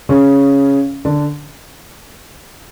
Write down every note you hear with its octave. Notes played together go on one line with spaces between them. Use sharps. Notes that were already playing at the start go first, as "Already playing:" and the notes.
C#3 C#4
D3 D4